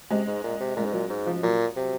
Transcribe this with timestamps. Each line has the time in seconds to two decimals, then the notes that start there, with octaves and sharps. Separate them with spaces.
0.10 C3 G#3
0.27 G#2
0.43 A#2
0.60 C3
0.76 A#2 G#3
0.85 G#2
0.93 A#2 F#3
1.10 G#2
1.26 F3
1.43 A#2 F#3
1.76 C3